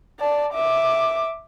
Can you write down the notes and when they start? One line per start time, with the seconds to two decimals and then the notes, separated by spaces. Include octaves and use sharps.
0.20 D5 A5
0.54 E5 D6